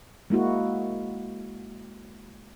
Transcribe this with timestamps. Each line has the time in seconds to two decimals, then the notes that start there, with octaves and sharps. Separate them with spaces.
0.30 G#3 A#3 E4 F#4